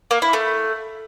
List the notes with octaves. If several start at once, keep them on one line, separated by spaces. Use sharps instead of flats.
A#3
E4
A3